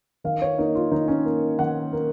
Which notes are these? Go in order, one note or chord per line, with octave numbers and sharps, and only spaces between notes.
D#3 F5
C#5
A#3 D#4
F4
D#3 D#4
C#4
A#3
D#3 F#5
A#3